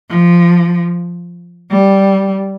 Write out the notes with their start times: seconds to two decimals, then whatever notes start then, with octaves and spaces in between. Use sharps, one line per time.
0.10 F3
1.71 G3